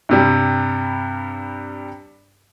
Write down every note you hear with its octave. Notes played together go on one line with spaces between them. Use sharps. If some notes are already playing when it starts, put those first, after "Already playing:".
G2 C3 G3